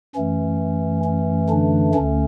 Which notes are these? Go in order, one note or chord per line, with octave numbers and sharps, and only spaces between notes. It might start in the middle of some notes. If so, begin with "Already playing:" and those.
F#2 E3 A3 C#4
C#4
D3 D4
D2 D3 A3 C#4